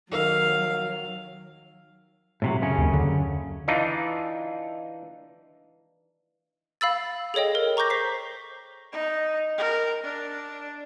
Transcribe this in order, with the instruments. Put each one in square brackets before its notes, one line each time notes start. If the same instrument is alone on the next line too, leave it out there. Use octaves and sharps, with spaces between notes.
[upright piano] D#3 A#4 E6 [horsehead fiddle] F#3 [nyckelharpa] F5
[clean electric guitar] A2 C3 F#3
F#2 C#3 C#4
[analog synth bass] D#2
D3
[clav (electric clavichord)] E3 D4 D#4 F4
[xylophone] F5 B5 E6 A6
G#4 A4 C#5 D#5 G5
A#4
A#5 C#6 D6 G6 A#6
C5 B6 C7
[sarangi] D#4
A#4
D4